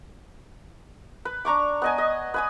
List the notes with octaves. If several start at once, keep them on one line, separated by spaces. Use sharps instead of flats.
B4
D4 A#5 C#6 D6
B3 D#5 G#5
D#5
B4 G#5 D#6